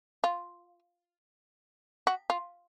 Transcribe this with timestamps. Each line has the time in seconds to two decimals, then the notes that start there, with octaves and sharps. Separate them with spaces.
0.24 F4
2.07 F#4
2.30 F4